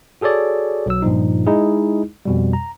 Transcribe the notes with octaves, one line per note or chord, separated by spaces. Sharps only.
F#4 G#4 A4 C#5 D5
B1 F#3 E6
G2 A#2 F3 D#4
G#3 D#4 E4 G#4
F2 B2 G3
A#5